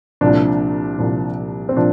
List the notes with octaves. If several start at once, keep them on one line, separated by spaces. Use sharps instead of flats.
C2 A#2 F3 D4
C2 A#2 F3
C4
A#2 F3 D4